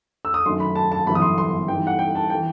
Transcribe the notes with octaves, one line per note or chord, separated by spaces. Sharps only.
E6
D#6
F#2 D#3 A3 D#4 C6
B5
A5
A5
G1 F#2 E3 B3 B5
D#6
C6
C6
G2 E3 B3 D#4 G5
F#5
G5
A5
G5
E3